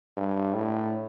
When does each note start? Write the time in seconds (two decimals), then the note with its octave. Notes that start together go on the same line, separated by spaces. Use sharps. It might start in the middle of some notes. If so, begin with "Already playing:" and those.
0.17 G2
0.54 A2